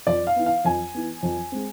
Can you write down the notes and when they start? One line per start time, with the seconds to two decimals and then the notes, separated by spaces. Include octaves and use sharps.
0.07 F2 D5
0.27 F5
0.36 E3 B3
0.46 F5
0.65 F2 G#5
0.95 E3 B3
1.23 F2
1.52 G#3 C4